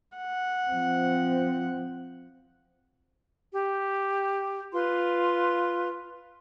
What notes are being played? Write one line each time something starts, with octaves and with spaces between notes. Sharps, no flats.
F#5
F3 C4
G4
F4 B4 C6